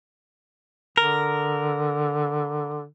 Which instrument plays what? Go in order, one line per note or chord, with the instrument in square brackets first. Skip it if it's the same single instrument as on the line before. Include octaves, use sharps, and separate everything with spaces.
[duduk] D3 [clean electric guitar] A#4